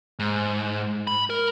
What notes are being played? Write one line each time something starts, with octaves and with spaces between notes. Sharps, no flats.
G#2
B5
A#4